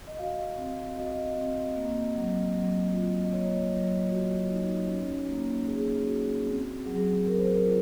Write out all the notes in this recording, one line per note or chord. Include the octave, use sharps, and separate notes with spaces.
D#5
F#4 F5
C4
F#4 D#5
C4
A#3
F#3
F#3
F4
D#5
A#3 C#5
F#3
F#4
D#4
C#4
A#3
A#3 G#4
F#4
C4
F#3 G#4
F#3 A#4
C5
A#4
F4